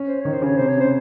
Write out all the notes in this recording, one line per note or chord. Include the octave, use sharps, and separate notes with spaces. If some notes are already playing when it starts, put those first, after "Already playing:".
Already playing: C#4
C5
D#3 C#5
C5
C#3 C#5
C3 C5
C#5
C#3 C5